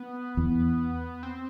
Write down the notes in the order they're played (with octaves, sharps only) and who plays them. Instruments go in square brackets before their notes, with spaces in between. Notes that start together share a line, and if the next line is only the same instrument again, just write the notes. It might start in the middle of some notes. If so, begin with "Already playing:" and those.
Already playing: [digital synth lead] B3
[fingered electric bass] E2
[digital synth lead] C4